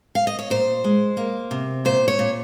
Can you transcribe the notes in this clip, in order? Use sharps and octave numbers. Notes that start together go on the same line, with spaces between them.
F5
D#5
C#5
A#2 C5
G#3
A#3
C3
A#2 C5
C#5
A#2